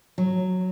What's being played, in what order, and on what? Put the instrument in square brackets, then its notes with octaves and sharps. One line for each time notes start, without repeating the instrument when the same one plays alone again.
[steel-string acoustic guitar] F#3